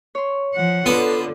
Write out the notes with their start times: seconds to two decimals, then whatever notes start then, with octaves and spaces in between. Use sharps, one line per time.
0.15 C#5 C6
0.55 F3 F#5
0.86 D3 B3 F4 A5